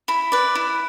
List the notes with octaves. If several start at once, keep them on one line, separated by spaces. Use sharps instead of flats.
E4 B5
B4 D5
E4